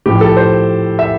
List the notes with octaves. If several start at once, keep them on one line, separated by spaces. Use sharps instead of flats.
A2 F3 G4
A4
C5
E5